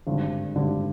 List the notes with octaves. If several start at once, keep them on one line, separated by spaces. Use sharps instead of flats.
G#1 G2 D3
G#1 G2 D3